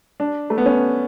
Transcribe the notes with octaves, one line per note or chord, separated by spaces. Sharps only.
D4
A3
B3
C#4